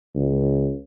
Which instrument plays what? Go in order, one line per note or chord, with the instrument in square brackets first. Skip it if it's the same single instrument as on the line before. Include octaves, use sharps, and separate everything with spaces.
[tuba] C#2